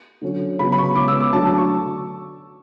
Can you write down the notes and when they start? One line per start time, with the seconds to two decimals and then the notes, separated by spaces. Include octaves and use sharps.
0.22 D3 F#3 C#4
0.59 C#3 F#3 B3 B5
0.72 B5
0.78 C#6
0.95 C#3 G#3 B3 D6
1.08 E6
1.20 D6
1.33 D3 F#3 A3 D4 A5
1.45 A5
1.58 C#6